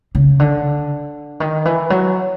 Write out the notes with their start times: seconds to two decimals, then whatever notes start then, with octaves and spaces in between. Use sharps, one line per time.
0.15 C#3
0.40 D3
1.40 D#3
1.65 E3
1.90 F#3